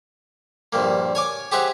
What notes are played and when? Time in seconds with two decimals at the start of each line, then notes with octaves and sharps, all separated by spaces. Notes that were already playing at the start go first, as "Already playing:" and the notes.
0.73 A#1 G2 A#3
1.15 C#5 G#5 D6
1.52 G4 G#4 C5 E5 F#5